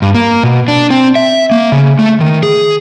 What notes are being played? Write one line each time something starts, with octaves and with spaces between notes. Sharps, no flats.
G2
A#3
B2
D4
C4
E5
A#3
C#3
A3
D#3
G#4